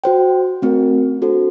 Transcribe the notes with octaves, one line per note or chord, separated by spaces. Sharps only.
F#4 C5 G5
A3 C4 F#4 A#4
D4 F#4 A4 C5